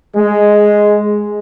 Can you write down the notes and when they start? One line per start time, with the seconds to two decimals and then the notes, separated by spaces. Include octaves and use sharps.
0.16 G#3